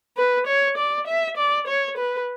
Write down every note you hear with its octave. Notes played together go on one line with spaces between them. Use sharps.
B4
C#5
D5
E5
D5
C#5
B4